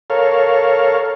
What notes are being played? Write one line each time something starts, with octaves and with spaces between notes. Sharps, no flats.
A4 A#4 C#5 F5